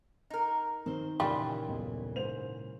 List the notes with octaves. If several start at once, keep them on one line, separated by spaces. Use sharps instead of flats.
D#4 A#4
D#3 C4 C5
A#2 C#3 E3 G3 F4
D#1 B1 D#5
G#2 C5 F7